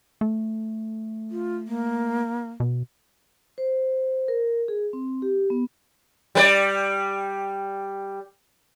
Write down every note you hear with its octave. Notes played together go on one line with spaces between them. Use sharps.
A3
F4
A#3
B2
C5
A#4
G#4
C4
G4
B3
G3 B4 D5